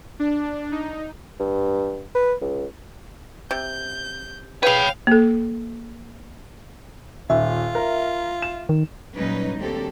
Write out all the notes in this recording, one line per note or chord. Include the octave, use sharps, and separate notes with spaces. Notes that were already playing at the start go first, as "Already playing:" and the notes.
D4
D#4
G2
B4
C#2
C3 G6
G#4 B4 C#5 F5 G5 B5 F7
A#3 A4
D#1 F4 E5
A#4
E7
D#3
A#2 F#3 G3 C#4 D#4 B4
D2 F#3 A#3 C4 G4 A4